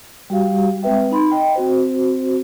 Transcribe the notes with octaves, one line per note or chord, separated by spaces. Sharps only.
G3 F#4 G4 F5
G#3 C4 B4 E5 G5
D#4 B5 C6
D#5 G5
C4 F#4 C5